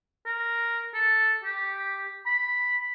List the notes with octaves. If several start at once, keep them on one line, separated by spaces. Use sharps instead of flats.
A#4
A4
G4
B5